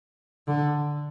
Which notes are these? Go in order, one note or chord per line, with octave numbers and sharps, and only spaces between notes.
D3